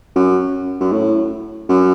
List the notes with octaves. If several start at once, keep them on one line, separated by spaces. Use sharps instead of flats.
F#2
F#2
A2
F#2